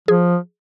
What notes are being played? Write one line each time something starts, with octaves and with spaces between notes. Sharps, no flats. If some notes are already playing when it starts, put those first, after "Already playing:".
F3 G#4